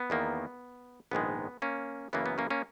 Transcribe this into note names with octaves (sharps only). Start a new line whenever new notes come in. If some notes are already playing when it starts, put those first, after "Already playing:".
Already playing: B3
E2 D#3 A#3
A#1 G#2 D#3 G#3 B3
A#3 C#4
F#2 C#3 E3 A#3 B3
B3
A#3 C#4
A#3 C#4